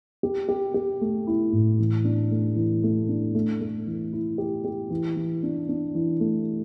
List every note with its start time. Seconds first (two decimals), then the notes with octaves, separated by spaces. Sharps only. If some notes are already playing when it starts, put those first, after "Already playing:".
0.23 G4
0.49 G4
0.74 G4
1.01 A3
1.27 E4
1.52 A2
1.79 E3
2.05 D4
2.31 A3
2.56 E3
2.83 A3
3.09 D4
3.35 A3
3.61 A3
3.87 E3
4.13 E4
4.38 G4
4.65 G4
4.90 E3
5.16 E3
5.43 D4
5.69 D4
5.95 E3
6.20 A3